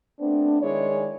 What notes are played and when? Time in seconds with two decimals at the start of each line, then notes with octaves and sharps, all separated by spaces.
0.20 A3 B3 C4 D4
0.61 D#3 G#3 E4 G#4 C#5 D5